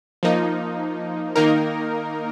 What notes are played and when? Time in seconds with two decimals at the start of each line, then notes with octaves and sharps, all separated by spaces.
0.23 F3 A#3 D#4
1.36 D#3 A#3 D#4 A#4